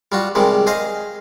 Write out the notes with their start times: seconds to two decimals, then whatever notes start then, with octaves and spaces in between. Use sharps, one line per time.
0.12 G3 F4 F#4
0.35 C3 D#3 G3 G#3
0.67 G#4 C5 D#5 F5